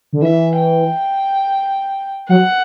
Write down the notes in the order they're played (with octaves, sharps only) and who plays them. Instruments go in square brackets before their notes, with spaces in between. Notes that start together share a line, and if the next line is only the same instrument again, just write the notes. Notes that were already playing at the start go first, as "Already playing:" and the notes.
[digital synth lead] D3
[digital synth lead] E3 [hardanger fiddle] E5
[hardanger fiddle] G5
[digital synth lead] F#3 [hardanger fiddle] F#5